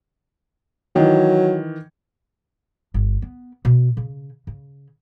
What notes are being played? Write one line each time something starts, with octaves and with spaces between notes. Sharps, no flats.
D#3 E3 F#3
G1
B3
B2
C#3
C#3